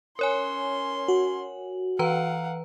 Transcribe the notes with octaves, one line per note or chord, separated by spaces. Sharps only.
C#4 A#4 C#5 G#5 C6
F#4
E3 B4 F5 F#5 A#5